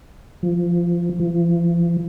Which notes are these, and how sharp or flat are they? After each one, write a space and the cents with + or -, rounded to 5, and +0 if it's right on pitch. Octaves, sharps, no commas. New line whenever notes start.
F3 -15
F3 -40